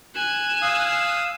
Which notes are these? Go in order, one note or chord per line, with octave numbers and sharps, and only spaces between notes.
G#5 F#6 E7
F5 D#6 E6